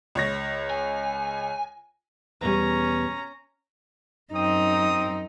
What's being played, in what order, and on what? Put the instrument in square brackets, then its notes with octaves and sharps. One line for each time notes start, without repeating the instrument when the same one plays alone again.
[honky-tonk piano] C#2 C#5 A#6
[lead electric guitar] G#5
[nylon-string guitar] E2 B2 G3 [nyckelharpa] C#4 A#5
[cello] F#2 D#4 [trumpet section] C4 D#6